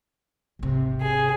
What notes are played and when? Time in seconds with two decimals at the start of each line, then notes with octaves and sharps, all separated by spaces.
0.59 G#1 C3
1.03 G#4